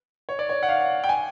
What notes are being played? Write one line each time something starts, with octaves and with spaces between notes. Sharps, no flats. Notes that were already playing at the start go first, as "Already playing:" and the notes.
C#5
D5
C#5
F#5
F5
G5
G#5